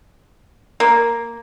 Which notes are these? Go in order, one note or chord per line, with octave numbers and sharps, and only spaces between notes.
A#3